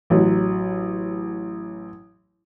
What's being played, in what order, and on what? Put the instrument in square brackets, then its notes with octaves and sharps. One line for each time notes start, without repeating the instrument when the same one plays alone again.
[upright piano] A1 F#3